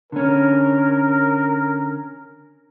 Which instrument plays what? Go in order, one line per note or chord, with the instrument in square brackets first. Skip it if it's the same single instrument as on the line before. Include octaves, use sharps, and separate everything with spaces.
[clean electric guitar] D3 C#4 [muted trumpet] A#4